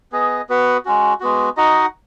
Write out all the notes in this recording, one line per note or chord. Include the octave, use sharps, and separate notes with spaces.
B3 G#4 D#5
B3 F#4 B4 F#5
G#3 C#4 F#4
G#3 B3 F#4
D#4 F#4 D#5 F#5